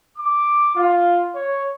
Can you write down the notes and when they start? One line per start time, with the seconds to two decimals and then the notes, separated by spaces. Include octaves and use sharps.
0.18 D6
0.76 F4
1.36 C#5